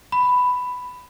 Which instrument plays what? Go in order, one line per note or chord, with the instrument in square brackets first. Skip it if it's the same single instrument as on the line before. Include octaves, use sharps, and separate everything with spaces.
[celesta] B5